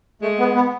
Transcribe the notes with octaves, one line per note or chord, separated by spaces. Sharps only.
G#3 A3
B3
B3